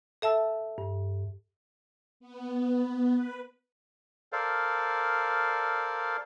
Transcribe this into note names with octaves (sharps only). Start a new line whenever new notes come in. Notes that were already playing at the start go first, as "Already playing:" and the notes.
A4 E5 A5 E6
G2
B3
B4
A4 A#4 C5 D5 F5